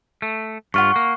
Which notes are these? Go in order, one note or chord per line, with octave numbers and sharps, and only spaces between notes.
A3
G2 F4 F#5 C#6
A#3